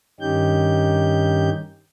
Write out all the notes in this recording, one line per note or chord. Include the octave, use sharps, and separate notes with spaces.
G2 D#3 C#4 D#4 G4 G6